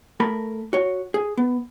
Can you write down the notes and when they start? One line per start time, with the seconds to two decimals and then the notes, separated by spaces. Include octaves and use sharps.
0.20 A3 A#4 B5
0.73 F#4 C#5
1.14 G#4
1.37 B3